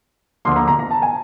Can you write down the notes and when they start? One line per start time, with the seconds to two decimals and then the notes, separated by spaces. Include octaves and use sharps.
0.45 D2 D3 F3 A#3 C6
0.56 A#5
0.68 A#5
0.79 A#5
0.91 A5
1.02 G#5